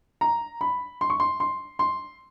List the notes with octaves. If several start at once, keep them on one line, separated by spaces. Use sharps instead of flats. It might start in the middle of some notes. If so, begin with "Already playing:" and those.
A#5
B5
C6
C#6
C6
C6
C6